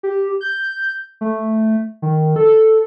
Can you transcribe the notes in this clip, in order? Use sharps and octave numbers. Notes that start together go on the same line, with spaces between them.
G4
G6
A3
D#3
A4